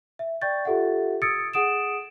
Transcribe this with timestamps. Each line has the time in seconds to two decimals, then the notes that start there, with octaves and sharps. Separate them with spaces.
0.19 E5
0.42 D5 G5 C#6 G6 A6
0.65 F4 G4 A4 E5 F#5
1.22 D#6 E6 G#6 A6 C#7 D7
1.54 G#4 F#5 D#6 D7 E7